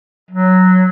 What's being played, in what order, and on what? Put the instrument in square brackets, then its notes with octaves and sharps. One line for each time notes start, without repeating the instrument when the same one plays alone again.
[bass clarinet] F#3